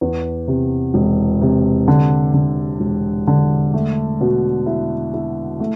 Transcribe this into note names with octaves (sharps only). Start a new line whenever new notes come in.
E2
C3
E1
C3
D3
D3
E1
D3
A3
B2
E4
E4
A3